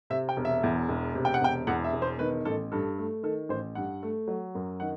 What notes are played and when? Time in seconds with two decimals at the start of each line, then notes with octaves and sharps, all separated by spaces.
0.10 C3 E5
0.29 G5
0.37 E1
0.45 E5
0.63 E2
0.89 E1
1.15 C3
1.25 G5
1.34 F#5
1.41 E1 G5
1.67 E2 F#5
1.84 E5
1.93 E1
2.02 C5
2.19 D#3 B4
2.45 A1 A4
2.72 G2 A4
2.98 A3
3.23 D#3 A4
3.49 A1 C5
3.75 G2 F#5
4.03 A3
4.28 F#3
4.55 F#2
4.80 D#3 F#5